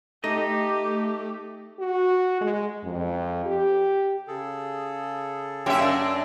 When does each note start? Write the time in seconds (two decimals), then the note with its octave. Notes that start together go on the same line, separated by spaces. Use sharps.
0.24 A3 D#4 G4 D#5
1.79 F#4
2.41 G#3
2.84 F2
3.45 G4
4.27 C#3 G#4 A4
5.66 F#2 A#3 C#4 G4 E5
5.82 D4 D5